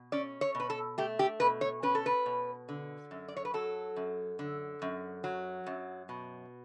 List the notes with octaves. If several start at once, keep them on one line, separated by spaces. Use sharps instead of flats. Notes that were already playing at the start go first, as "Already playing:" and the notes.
Already playing: B2
C#4 D5
C#5
B2
B4
A4
A3 G4
G4
B2 B4
C#5
C#4 B4
A4
B4
B2
D3
F#2
D5
C#5
B4
F#3 A4
F#2
D3
F#2
F#3
F#2
B2